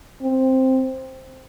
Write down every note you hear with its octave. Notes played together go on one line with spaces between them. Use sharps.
C4